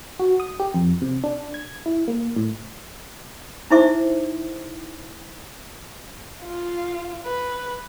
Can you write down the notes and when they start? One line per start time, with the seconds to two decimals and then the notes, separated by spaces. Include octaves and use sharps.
0.20 F#4
0.40 D#6
0.60 G4
0.74 F2
1.01 C3
1.24 D4
1.54 G#6
1.86 E4
2.08 A#3
2.36 A2
3.70 D#4 E4 C5 E5 D6
6.44 F4
7.26 B4